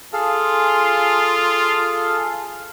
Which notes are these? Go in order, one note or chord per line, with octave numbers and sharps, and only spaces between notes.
F4 G#4 A4 F5